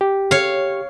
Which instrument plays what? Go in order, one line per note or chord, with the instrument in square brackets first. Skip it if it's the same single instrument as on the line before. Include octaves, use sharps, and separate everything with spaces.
[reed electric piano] G4
[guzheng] C#5 F5